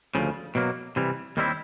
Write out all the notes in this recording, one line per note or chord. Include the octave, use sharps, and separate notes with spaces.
D2 C#3 F3
B2 F#3 A#3
C3 E3 G3
D#2 D#3 G3 C4 E4